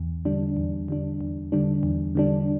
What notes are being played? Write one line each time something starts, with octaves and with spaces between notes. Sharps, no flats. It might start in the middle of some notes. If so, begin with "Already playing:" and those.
Already playing: E2
D3 G3 D4
E2
D3 G3 D4
E2
D3 G3 D4
E2
D3 G3 D4